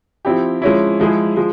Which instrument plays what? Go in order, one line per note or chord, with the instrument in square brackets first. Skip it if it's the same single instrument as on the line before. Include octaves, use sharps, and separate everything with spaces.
[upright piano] F3 C4 E4 G4
F3 G#3 C#4 E4
F3 G#3 E4 G#4
F3 G#3